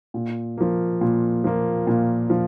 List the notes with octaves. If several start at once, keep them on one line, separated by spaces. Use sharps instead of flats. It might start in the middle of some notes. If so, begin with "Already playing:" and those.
A#2
F3 A#3
A#2
F3 A#3
A#2
F3